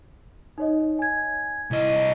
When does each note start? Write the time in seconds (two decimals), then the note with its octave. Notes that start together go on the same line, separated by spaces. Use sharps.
0.58 D#4 C#5 D#5
0.99 G#5 G#6
1.71 C2 E4 D#5